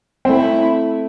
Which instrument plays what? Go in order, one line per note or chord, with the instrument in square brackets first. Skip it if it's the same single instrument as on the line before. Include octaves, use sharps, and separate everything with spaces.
[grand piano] C4
[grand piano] A3 [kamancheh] E4